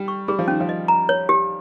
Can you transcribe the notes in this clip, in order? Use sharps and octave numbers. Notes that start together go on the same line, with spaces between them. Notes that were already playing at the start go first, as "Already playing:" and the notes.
Already playing: G3 G5
C#6
G3 G#4
F3
D#3 C#4
F3
D#5
A#5
C#5
G4